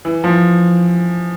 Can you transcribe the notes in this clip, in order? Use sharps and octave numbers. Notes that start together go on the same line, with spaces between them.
E3
F3